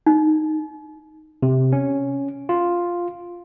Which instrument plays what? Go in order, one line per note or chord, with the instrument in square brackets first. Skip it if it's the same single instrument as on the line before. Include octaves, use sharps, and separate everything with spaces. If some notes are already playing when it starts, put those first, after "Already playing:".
[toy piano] D#4
[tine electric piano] C3
C#4
F4